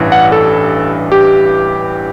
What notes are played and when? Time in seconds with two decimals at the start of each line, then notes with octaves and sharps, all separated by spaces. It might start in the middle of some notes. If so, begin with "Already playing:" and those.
Already playing: A1 G2 E3
0.12 F#5
0.32 A4
1.12 G4